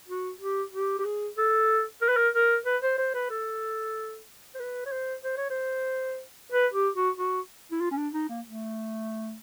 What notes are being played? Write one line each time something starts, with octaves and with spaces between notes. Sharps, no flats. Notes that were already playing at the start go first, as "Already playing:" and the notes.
F#4
G4
G4
G4
G#4
A4
A#4
B4
A#4
A#4
B4
C5
C5
B4
A4
C5
B4
C#5
C5
C5
C#5
C5
B4
G4
F#4
F#4
E4
F4
C#4
D4
D#4
A#3
A3